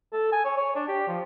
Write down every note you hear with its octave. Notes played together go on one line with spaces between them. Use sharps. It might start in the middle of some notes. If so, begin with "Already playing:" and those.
A4
G#5
C#5
C#5
D4
G4
F3